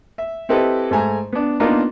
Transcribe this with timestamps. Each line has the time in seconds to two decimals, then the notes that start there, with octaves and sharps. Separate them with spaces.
0.18 E5
0.49 C4 E4 G4 A4 B4 D#5
0.91 G#2 A3 G#5 A#5
1.33 B3 D4
1.60 A#3 B3 D4 D#4 F4 A#4